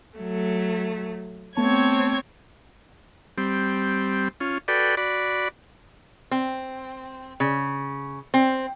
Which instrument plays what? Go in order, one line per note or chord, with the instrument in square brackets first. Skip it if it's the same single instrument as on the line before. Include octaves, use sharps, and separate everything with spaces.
[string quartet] F#3 A3
[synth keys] A3 B3 A5 [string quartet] C4 C#5 G#6
[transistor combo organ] G3 C4
C#4 F4
F#4 A4 B4 D5 G5
F#4 D5 B5
[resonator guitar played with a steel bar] C4
C#3
C4